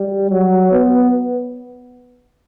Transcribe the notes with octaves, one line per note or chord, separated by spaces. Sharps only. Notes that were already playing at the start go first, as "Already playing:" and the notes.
Already playing: G3
F#3
B3